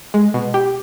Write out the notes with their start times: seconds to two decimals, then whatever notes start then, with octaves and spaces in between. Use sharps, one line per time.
0.14 G#3
0.34 B2
0.54 G4